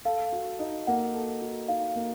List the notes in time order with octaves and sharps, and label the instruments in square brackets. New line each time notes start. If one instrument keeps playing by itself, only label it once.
[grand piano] A4 [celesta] F5
[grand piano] F#4
D#4
[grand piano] A#3 [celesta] F#5
[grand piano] A4
F#4
[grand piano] D#4 [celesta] F5
[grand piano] A#3